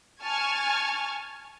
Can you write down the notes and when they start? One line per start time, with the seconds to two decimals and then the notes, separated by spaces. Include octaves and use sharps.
0.22 G#5 A5 C#6 F6 G#6